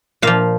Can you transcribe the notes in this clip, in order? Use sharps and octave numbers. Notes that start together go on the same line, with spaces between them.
A#2 F3 F5